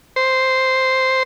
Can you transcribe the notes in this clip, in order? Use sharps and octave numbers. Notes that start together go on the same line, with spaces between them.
C5